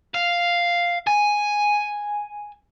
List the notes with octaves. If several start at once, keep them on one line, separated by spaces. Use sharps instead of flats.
F5
G#5